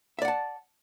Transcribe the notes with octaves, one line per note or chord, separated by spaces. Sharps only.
D5 E5 F#5 A5